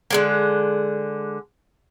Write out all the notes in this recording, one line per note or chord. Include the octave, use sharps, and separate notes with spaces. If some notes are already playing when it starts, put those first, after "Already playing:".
D3 G#3 A#3